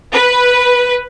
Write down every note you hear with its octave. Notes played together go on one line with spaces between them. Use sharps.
B4